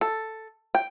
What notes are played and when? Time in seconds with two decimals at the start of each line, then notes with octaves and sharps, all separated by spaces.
0.01 A4
0.75 G5